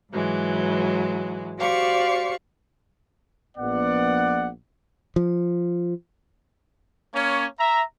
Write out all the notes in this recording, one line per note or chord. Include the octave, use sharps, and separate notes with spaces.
G#2 E3 F#3 G#3
F#4 G4 C5 D5 F5 C#6
A#1 B3 D5 F#5
F3
A#3 C#4 C#5
E5 A#5